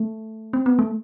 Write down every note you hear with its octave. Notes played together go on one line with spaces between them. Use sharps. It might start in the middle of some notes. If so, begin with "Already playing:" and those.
Already playing: A3
C4
B3
A3